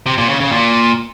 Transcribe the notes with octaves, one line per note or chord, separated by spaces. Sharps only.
C3
A#2
C#3
C#3
A#2